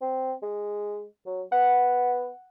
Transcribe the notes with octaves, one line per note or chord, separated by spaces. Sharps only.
C4
G#3
F#3
B3 F#5